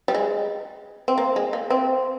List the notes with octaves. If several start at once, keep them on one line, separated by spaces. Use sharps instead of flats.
G3
G#3
C4
A#3
G#3
A#3
C4